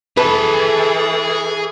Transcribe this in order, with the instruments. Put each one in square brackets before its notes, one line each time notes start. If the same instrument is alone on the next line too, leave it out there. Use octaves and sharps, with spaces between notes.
[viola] E3 A4 [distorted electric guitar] G#4 A5 [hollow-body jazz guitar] B4